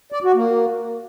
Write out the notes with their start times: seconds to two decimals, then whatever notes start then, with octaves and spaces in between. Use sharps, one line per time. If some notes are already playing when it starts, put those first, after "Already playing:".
0.12 D5
0.24 F#4
0.35 A#3